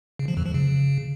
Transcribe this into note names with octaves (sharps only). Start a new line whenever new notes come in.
C#3
F3
F2
F3
C#3